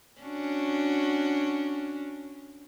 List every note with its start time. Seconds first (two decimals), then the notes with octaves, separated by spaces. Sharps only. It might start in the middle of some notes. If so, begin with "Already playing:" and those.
0.21 C#4 D4 F#4